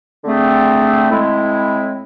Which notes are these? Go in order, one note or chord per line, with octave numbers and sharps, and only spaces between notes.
D3 A3 C4 G#4
A2 G#3 C4 E4